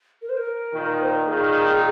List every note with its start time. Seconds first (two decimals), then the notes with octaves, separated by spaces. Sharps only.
0.22 A#4
0.29 C5
0.37 A#4
0.74 A#2 D#3
1.02 C5
1.15 A#4
1.27 A#2 D#3 G#4